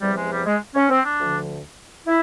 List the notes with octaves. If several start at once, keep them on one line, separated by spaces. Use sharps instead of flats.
E2 C3 F3 G3
G#3
G3
G#3
C#4
C4
D4
D2 D3 F3
E4